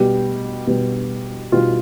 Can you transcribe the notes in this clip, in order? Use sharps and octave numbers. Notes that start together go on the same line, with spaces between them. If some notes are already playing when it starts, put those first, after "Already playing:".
Already playing: B2 G3 B3 G4
B2 G3 B3
B2 G3 B3 F4